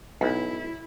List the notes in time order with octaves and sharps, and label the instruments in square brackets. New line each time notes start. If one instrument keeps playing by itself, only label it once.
[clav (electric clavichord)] B1 [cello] E4